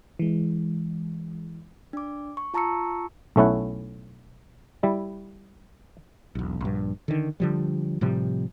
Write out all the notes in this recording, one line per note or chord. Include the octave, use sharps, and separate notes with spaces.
E3 G#3
D4 D6
C#6
F4 A5 A#5 C#6 E6 C#7
B1 A3 C#4 E4 F#5
G3 E4
E1 B1
A#1 G2
D3 D#3
D3 F3 G3
A2 C3 F3 G3